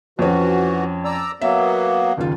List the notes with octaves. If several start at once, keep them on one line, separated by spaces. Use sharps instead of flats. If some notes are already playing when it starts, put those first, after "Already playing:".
F2 E3 C#4 F#4
D5 A#5 E6
F#3 A#3 B3 E5
F#1 D#2 F4